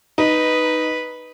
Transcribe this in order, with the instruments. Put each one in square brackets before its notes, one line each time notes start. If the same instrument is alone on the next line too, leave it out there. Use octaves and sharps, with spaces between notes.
[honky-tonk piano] D#4 [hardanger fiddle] B4